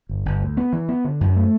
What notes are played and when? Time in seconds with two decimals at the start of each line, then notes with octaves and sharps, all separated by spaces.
0.09 G1
0.26 G1
0.42 D2
0.57 B3
0.73 E3
0.89 B3
1.05 D3
1.21 F#2
1.36 A3